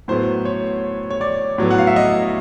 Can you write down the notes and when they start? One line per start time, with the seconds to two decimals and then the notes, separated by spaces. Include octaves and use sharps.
0.08 A2 F#3 B3 C5
0.45 C#5
1.10 C#5
1.21 D5
1.58 A2 F#3 B3
1.71 F#5
1.78 F5
1.87 E5
1.96 D#5